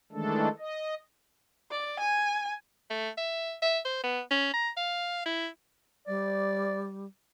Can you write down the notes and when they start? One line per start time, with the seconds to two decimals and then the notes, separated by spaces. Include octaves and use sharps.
0.12 D#3 E3 G#3 A3 D4 A4
0.59 D#5
1.71 D5
2.00 G#5
2.90 A3
3.17 E5
3.62 E5
3.85 C5
4.03 B3
4.31 C#4
4.53 A#5
4.77 F5
5.25 E4
6.08 G3 D5